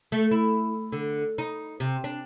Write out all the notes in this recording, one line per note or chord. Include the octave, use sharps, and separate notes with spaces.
A3
E4
D3
D#4
C3
D4